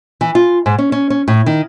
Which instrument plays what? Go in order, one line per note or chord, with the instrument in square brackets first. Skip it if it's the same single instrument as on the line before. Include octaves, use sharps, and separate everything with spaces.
[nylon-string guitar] E3
F4
G#2
C#4
C#4
C#4
A2
D#3